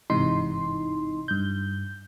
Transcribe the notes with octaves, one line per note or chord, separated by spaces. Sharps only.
G1 G#2 C3 E3 D#4 C6
G2 G6